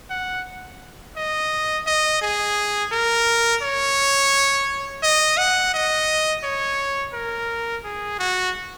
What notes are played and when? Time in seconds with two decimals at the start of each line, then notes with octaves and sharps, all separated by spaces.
0.10 F#5
1.17 D#5
1.86 D#5
2.22 G#4
2.92 A#4
3.62 C#5
5.03 D#5
5.37 F#5
5.74 D#5
6.44 C#5
7.13 A#4
7.84 G#4
8.19 F#4